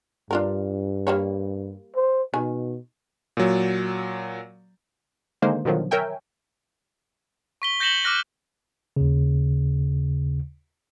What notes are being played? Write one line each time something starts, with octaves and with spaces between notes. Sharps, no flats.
G2 D4 F4 A#4
G3 A#3 C#5
C5
B2 D#3 G#5
A#2 F#3
D3 D#3 G#3 A#3 C5
B2 D3 D#3 F3 F#3
A#4 C#5 E5 G5 G#5
C#6 B6 G7
G6 A#6 C#7 E7 F#7 G7
D6 F6 F#6 A#6
D#2 C#3